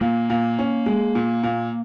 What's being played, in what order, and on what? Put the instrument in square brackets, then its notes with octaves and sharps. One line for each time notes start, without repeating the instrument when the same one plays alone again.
[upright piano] A#2 [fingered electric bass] A#3
[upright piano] A#2
C#4
G#3
A#2
A#2